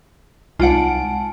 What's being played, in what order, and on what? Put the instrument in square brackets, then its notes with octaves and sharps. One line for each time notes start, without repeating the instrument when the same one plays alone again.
[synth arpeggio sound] C2 D7 [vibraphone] G#3 A5 [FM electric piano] D#4 [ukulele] F4 F#5